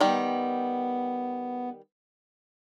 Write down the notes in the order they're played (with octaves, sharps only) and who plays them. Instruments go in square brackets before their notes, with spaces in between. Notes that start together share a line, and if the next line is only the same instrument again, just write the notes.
[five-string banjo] D#3 G3 [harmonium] B3